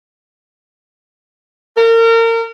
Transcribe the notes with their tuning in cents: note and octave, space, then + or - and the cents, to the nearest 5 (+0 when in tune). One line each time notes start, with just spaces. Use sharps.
A#4 -30